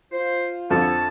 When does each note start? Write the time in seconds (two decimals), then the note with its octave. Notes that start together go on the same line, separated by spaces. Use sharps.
0.12 F4 C5
0.70 F2 D3 F3 A4 C#5 A5